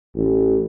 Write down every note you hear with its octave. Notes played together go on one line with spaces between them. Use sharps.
A1